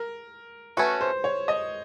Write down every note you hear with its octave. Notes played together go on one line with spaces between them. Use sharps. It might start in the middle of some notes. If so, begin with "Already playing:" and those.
Already playing: A#4
A3 C#4 F#4 B4
C5
C#5
D#5